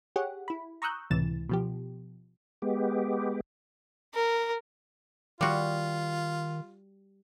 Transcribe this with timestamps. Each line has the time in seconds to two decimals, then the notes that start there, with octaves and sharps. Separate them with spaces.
0.16 G4 G#4 C#5 F#5
0.48 E4 B5
0.82 A#5 C#6 D#6 E6 F#6 G6
1.10 C#2 A2 C3 E3 A6 E7
1.49 B2 F3 G4
2.62 G#3 B3 G4
4.14 A#4
5.41 D#3 G3 F4 F#4